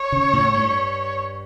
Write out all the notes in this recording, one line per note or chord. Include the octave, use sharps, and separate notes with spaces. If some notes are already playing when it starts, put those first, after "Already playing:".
Already playing: C#5
C#3
A2
G2